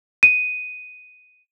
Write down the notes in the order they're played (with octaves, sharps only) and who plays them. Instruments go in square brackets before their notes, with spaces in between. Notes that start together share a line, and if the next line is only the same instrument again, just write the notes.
[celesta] D#7